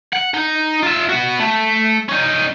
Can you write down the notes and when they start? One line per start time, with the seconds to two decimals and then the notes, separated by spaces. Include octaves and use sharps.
0.13 F#5
0.34 D#4
0.83 F4 E5
1.10 B3 F#4
1.40 A3
2.09 C#4 D#4